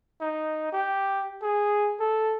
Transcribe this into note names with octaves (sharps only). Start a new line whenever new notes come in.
D#4
G4
G#4
A4